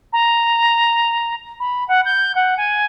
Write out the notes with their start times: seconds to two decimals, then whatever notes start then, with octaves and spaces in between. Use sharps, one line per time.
0.12 A#5
1.59 B5
1.88 F#5
2.05 G6
2.35 F#5
2.57 G#5